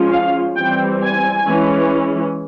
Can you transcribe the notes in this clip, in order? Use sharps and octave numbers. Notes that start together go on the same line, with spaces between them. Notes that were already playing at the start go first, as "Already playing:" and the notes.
Already playing: F3 G#3 C#4 F4
F5
E3 G3 C4 G5
G#5
E3 G#3 C#4